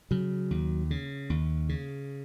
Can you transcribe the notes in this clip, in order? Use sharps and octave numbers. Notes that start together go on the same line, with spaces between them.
C#3 F#3
D#2
C#3
D#2
C#3